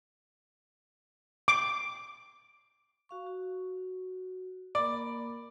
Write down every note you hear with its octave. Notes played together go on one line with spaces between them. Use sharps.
D6
F#4 F5 C#6
F#4
A#3 A#4 D5 B5